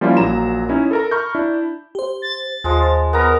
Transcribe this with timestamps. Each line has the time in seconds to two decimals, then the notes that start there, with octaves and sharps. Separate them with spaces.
0.01 F3 G3 A#3 C#4 E4 F4
0.17 A#1 F#3 A#3 A#5 E7
0.69 C#4 D#4 E4
0.91 A4 A#4 A#5
1.11 A#5 B5 C#6 F6 G6
1.35 D4 E4
1.95 G4 C5
2.22 A6
2.64 D#2 F3 G#3
3.13 B3 A#4 A#5